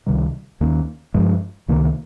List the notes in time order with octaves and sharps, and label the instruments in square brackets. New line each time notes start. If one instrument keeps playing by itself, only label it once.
[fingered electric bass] C#2 C3 D#3 G3
D#2 D#3 A#3 C#4
G2 F3 G#3
C#2 C3 D#3 A#3